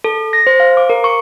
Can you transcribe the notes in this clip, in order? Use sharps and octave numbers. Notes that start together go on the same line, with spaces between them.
A4
A#6
C5
F5
D6
A#4
C#6